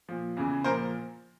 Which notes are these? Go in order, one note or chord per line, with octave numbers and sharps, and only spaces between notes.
A#2 F3
E2 C#3 E3
A#2 F3 A#4 C5